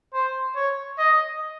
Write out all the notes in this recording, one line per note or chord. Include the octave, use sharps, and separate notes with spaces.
C5
C#5
D#5